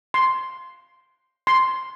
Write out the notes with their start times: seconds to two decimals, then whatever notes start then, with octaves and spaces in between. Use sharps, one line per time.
0.14 C6
1.47 C6